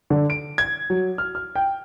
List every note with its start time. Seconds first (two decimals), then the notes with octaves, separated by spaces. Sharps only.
0.10 D3
0.30 D7
0.58 G#6
0.90 F#3
1.18 F6
1.35 F6
1.56 G5